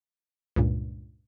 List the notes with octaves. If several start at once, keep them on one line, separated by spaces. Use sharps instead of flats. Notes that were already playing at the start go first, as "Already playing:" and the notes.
C#2 G2 A#2